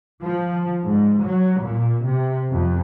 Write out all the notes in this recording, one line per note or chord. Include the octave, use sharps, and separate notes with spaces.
F3
G#2
F#3
A#2
C3
F2